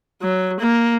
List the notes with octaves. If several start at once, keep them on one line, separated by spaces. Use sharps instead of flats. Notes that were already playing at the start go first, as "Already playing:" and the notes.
F#3
A#3